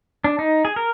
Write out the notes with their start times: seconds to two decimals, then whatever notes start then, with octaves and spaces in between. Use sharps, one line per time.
0.24 D4
0.39 D#4
0.65 G#4
0.76 A#4